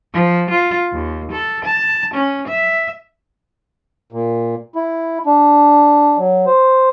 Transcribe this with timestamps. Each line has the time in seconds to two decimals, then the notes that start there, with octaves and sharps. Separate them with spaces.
0.12 F3
0.50 F4
0.93 D#2
1.32 A4
1.66 A5
2.14 C#4
2.48 E5
4.12 A#2
4.75 E4
5.26 D4
6.18 F#3
6.46 C5